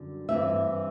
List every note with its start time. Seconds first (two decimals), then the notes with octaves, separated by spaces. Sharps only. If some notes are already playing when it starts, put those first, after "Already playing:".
Already playing: F#2 D3 G3
0.29 G2 E3 A3 C4 E5